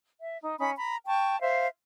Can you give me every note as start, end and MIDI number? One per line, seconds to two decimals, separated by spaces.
0.20 0.37 76
0.42 0.54 63
0.60 0.72 61
0.60 0.72 63
0.60 0.72 83
0.77 0.96 82
0.77 0.96 83
1.06 1.39 79
1.06 1.39 81
1.06 1.39 85
1.41 1.67 72
1.41 1.67 76
1.41 1.67 77